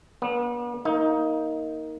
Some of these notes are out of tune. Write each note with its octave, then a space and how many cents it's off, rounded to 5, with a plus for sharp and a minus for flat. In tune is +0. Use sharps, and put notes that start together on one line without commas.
B3 -40 D4 -30
A#3 +0 D#4 +20